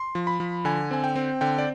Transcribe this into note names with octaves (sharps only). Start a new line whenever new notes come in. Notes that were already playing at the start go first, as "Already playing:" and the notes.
Already playing: C6
F3
B5
F3
D3 G#5
C4 G#5
G5
C4
D3 G5
D5